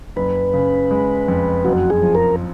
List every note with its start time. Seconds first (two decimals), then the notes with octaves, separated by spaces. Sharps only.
0.16 F#1 B4
0.54 C#3
0.91 G#3
1.28 F2
1.65 F#1 F#4
1.90 G#4
2.02 F3
2.15 A#4